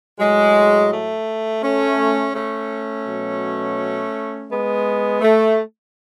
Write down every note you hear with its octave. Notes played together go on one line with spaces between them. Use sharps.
A2 F#3 G#3
A3
A3 C#4
A3 C#4
B2 F#3
G#3 B3
A3